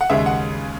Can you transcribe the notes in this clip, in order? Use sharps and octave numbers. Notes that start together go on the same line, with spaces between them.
F#5
D#2 C#3 G#3 E5
F#5